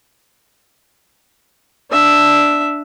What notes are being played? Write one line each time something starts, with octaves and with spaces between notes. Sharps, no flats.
D4 E5